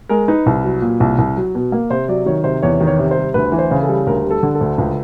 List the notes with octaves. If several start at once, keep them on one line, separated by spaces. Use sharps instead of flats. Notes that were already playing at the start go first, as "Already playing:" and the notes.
G#3 A#4
D#4 B4
C2
F#3
A#2
C2
C2
F#3
B2
A#3
C3 C5
F#3 D5
D#3 C#5
C3 C5
E2 C#5
D#3
C#5
C3
C5
G3
D2 B4
E3
C5
C#3
A4
G3
D2 A#4
G3
A4
D3
A4
D2
C#2